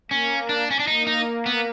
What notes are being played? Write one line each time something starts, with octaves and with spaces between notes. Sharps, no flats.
A#3 C#4
D4
C#4
D4
A#3 D#4
D#4
B3